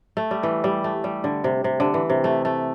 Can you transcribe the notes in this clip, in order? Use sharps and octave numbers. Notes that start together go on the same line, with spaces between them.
A3
G3
E3
G3
A3
G3
D3
C3
C3
D3
E3
C3
A3
A3